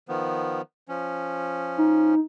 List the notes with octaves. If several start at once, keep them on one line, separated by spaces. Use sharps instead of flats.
D#3 F3 B3
F3 C#4
D#4